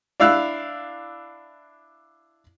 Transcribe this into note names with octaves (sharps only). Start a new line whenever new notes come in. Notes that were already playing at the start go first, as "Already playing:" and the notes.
D4 E4 F5 E6 F#6